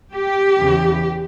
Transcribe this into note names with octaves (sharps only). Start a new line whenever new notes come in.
G4
E2 C#3 E3